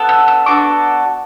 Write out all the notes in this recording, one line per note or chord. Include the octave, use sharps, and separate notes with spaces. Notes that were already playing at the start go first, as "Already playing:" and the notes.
Already playing: B3 D4 A4
E6
E6
B3 D4 F#4 A4 D6